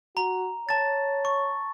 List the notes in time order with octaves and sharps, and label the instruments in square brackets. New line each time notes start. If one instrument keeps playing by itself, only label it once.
[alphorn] F#4 [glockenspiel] A#5
[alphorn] C#5 [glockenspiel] A5 A6
[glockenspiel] C#6